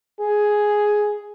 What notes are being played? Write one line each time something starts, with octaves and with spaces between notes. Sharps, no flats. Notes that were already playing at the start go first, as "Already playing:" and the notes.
G#4